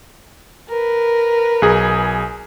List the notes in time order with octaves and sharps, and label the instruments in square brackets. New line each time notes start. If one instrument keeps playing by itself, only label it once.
[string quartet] A#4 B4
[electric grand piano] B1 G#4